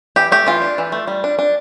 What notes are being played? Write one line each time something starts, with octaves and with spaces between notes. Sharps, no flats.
E3 G4
A3 G4
E3 F4
D4
E3
A3
G3
D4
D4